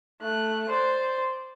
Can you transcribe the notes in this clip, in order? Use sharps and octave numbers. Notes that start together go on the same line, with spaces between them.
A3 F#6
C5 D5